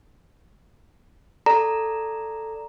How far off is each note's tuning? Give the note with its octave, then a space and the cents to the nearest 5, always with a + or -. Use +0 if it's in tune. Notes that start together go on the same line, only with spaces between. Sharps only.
A4 +5 D5 +0 A#5 +0